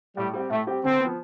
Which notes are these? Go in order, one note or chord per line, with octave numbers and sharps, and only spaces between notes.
A2 G3
G3 C4 G4
A2 A3
G3 C4 G4
D3 C4
B3
F3